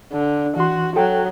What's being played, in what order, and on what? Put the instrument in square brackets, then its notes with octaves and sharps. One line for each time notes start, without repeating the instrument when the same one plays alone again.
[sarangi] D3
[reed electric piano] E3 C6 [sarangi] F#4
[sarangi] F#3 [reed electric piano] A4 G5